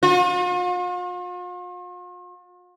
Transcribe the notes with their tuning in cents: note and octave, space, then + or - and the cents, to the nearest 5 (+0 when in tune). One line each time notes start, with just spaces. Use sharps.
F4 +45